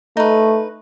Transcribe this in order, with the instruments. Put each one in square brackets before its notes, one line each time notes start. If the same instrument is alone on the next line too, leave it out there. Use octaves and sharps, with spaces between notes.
[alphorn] A3 [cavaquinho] D#4 B4